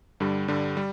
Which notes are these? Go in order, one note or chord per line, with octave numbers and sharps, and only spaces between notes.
G2 D3 G3
G2 D3 G3
G3